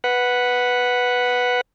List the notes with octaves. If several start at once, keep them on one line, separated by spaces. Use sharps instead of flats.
B4 F#5